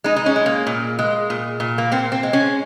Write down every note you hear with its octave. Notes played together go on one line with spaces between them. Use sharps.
G#3 D#4
D#4
C#4
G#3
A#3
A#2
G#3
A#2
A#2
A#3
A#2 C4
C4
G#3
C#4